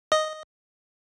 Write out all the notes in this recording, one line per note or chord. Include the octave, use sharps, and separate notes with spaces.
D#5